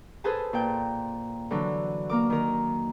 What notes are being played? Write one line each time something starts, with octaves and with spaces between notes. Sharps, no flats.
G#4 A4 B4 C5 G#5 A5
A#2 G5
D3 E3 F#3
A#3 A#4 D6
D#3 A#4